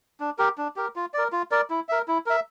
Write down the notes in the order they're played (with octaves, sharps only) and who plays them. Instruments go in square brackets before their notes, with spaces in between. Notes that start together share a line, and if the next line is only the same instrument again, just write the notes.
[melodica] D4
G4 A#4
D4
G4 A#4
F4
A#4 D5
F4
A#4 D5
E4
A#4 E5
E4
A#4 E5